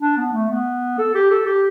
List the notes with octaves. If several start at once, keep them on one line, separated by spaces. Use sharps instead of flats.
D4
B3
A3
B3
A4
G4
A4
G4